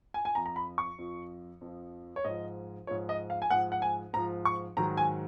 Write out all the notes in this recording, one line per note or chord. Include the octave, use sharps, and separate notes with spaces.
G#5
G#5
F2 F3 A#5
A#5
B5
C#6
F2 F3
F2 F3
C#5
G#2 F3 D#5
G#2 F3 C#5
D#5
F5
G#5
G#2 F3 F#5
F#5
G#5
G#2 F3 A#5
C#6
G#2 D#3 F#3 A#5
G#5